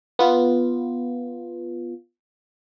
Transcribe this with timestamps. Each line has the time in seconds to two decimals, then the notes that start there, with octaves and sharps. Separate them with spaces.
0.19 B3 F4